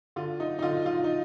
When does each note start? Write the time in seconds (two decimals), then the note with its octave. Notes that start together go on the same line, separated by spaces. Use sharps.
0.16 D3 F4
0.40 D#4
0.59 D#4
0.62 D3 F4
0.86 F4
1.04 D#4